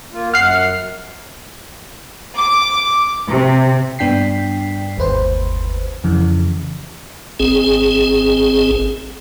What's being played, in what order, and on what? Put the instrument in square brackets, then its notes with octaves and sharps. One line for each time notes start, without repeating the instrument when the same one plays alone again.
[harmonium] A#3 F4
[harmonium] F#2 F#5 [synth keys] F6 F#6 C7
[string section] D6
C3
[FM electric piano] G2 B3 D4 G5 B6 C7
G1 D#2 B4 C5
F2 C#3 E3
[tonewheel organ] G#1 C4 G#4